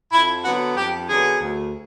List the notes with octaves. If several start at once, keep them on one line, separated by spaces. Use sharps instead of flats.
F2 E4
D3 F#3 B3 F#4
F2 G4
D3 F#3 B3 G#4
D2